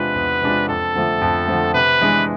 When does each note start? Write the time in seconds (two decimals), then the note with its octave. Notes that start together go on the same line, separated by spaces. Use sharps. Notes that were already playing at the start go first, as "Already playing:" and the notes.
Already playing: E2 C3 G#3 D4 F4 B4
0.15 E2
0.42 C3 G#3 D4 F4
0.68 F2 A4
0.95 D3 F3 A3
1.21 F2
1.48 D3 F3 A3
1.74 C3 B4
2.01 E3 G#3 D4